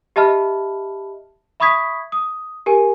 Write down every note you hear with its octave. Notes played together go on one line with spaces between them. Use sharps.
G4 D#5 E5 A5 B5 F6
E5 B5 C#6 D#6 G#6 B6
D#6
G4 A#4 G#5